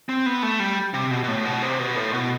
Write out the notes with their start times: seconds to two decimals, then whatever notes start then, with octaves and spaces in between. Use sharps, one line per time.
0.09 C4
0.26 B3
0.43 A3
0.60 G3
0.94 C3
1.11 B2
1.24 B2
1.28 A2
1.45 B2
1.62 C3
1.79 B2
1.96 A2
2.13 B2